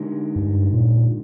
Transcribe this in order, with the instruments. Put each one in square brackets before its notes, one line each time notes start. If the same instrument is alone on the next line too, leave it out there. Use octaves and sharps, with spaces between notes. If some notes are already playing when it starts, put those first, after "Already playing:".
Already playing: [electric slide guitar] D3 G#3 D#4 G4 A#4
[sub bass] G2
A#2